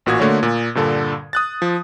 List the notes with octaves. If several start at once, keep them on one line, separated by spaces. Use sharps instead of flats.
A1 A#2 F#4 D#6 G#6
D3 A3 A#3 F#4 C#5
A#2
G2 A#2 D3 A4
D#6 F#6 A6
F3